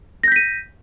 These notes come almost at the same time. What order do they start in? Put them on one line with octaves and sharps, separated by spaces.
A#6 G6 B6 D#7